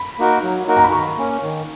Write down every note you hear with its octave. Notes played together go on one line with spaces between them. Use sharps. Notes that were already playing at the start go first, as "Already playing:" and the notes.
Already playing: B5
A#3 D#4 F#4 A#4
F#3
A#3 D#4 F#4 A#4
A#5
B5
D#3 C#6
A#3 C#4
D#3